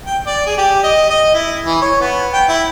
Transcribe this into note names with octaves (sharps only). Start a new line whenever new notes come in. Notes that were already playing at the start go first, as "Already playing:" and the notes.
G5
D5
G#4
G4
D#5
D#5
E4
E3
C#5
B3
G5
E4